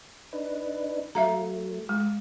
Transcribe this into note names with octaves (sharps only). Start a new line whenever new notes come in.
D4 D#4 B4
F#3 A3 E5 F5 A#5
G#3